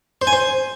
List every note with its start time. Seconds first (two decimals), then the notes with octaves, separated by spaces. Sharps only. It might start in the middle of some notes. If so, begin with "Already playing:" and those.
0.22 C5
0.27 G#5
0.33 C5